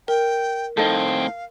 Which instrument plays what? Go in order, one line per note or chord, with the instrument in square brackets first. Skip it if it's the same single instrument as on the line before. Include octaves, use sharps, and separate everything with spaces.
[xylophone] A#4 [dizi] G5
[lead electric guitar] A2 C4 [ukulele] D#4 A4 [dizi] F5